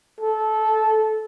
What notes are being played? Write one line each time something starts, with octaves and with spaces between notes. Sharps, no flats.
A4